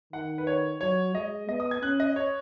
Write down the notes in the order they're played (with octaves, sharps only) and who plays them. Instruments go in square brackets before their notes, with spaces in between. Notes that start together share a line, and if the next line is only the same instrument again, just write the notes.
[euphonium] D#3 [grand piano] F#5
[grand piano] B4
C#5
[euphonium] F#3 [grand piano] C#5
[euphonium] G#3 [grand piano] D#5
[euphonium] B3 [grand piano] D#5
[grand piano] D#6
G#6
[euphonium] C#4 [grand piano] F#6
[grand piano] D#5
C#5